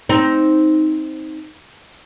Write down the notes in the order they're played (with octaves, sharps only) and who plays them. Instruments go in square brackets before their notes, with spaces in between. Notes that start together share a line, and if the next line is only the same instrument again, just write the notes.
[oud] C4 D#4